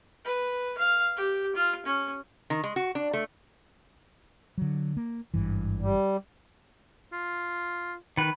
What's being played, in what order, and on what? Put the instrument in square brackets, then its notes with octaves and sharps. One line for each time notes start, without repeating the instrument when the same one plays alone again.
[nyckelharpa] B4
F5
G4
F4
C#4
[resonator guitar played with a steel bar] D#3
G#3
F#4
D4
A3
[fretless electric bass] D3 F#3
A#3
G#1 G2 E3
[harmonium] G3
[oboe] F4
[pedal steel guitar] D#3 B4